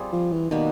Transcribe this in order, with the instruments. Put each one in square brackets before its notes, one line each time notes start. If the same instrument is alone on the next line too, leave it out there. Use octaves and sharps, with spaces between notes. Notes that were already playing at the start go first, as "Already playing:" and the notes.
Already playing: [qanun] G3 C4 F4 G#4
[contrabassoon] F3
E3
[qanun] B2 G3 A#3 [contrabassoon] D#3